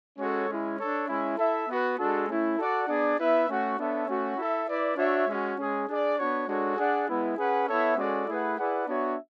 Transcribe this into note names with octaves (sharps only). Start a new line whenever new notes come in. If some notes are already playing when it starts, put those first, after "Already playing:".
G#3 C#4 F#4 A4 C#5
G#3 C#4 E4
D4 A4 C#5
G#3 C#4 E4
E4 A4 E5
B3 F#4 B4
G#3 D4 F#4 A4
A3 C#4 E4
F#4 A4 D5 F#5
B3 D4 G#4 D5
B3 E4 B4 E5
A3 C#4 F#4
B3 D4 A4 C#5 E5
A3 C#4 F#4
E4 A4 E5
E4 B4 D5
D4 F#4 C#5 E5
G#3 C#4 F#4
G#3 C#4 G#4
D4 G#4 D5
B3 D4 F#4 C#5
G#3 D4 F#4 A4 C#5
D4 G#4 D5 F#5
G#3 B3 E4
C#4 G#4 B4 F#5
B3 E4 A4 C#5 E5
G#3 C#4 F#4 A4 D5
A3 E4 G#4 B4 F#5
E4 G#4 B4 D5 F#5
B3 D4 F#4 C#5 E5